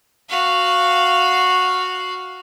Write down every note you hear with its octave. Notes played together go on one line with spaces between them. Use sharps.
F#4 F5